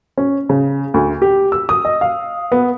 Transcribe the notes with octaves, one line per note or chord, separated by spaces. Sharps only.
C#4
C#3
D2
G4
E6
D#6
D#5
F5
B3